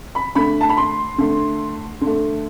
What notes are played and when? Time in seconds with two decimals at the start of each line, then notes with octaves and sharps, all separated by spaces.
0.15 B5
0.35 D3 A3 B5
0.61 A5
0.69 B5
0.77 C6
1.18 D3 A3
2.01 D3
2.07 A3